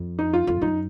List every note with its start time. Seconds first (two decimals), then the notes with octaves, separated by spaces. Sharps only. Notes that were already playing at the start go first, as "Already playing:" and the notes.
Already playing: F2
0.19 D#4
0.33 F4
0.47 F2 F4
0.61 F#2 D#4